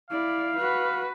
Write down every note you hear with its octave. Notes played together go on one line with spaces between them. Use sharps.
E4 D5 F5
F#4 B4